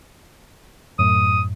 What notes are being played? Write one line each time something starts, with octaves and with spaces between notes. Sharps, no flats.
F#2 A2 D#6